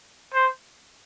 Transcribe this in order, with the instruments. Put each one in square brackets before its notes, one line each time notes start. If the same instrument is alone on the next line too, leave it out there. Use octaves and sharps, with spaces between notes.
[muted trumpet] C5